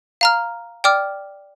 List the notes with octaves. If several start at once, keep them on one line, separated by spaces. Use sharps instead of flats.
F5 A#5 F6
D5 G5 D6 F6